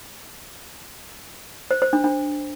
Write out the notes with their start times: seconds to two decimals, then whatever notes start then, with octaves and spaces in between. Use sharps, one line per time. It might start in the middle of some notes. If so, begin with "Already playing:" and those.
1.71 C5
1.82 C5
1.93 D4
2.04 D4